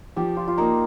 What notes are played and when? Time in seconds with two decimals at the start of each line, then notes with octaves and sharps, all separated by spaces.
0.16 F3 G4
0.37 F4
0.48 F4
0.58 A#3 D#4